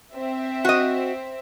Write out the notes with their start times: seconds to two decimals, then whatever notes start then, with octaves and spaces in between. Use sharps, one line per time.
0.14 C4 E5
0.65 F#4 D#5